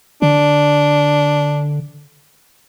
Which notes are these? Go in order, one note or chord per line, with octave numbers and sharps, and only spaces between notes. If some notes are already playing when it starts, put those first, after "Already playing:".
D3 D4